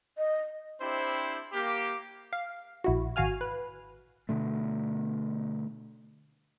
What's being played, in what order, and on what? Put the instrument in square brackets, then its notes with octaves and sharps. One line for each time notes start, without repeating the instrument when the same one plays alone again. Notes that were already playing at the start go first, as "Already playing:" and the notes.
[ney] D#5
[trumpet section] C4 D4 E4 G4 C5
A#3 G4
[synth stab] F5
A#1 E4 F#4
G#1 F#4 F5 G#5 F6
B4
[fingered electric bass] B2 D3 A3